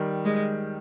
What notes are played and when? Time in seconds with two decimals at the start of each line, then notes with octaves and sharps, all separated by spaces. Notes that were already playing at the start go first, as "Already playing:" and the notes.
Already playing: D#3 G3
0.25 G#3